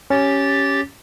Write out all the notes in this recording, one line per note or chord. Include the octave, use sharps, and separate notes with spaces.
C#4 G4 A6